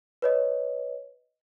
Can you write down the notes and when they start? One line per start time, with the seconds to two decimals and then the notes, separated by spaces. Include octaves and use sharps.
0.22 B4 C#5 D#5